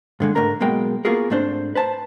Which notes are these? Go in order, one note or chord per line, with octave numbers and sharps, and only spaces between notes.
G2 D3 G#3
G#2 A3 D4 A#4 A#5
B1 B2 G#3 A#3 G5
A#3 B3 F4 F#4 G#4 A#4
G#2 A3 C4 D4 C5
B4 C5 A5